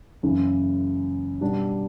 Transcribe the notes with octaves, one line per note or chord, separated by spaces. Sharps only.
F#1 F#2 C#3 E3
B2 G3 D4